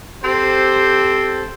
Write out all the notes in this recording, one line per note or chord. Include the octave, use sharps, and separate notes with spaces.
C4 G4 A4 C5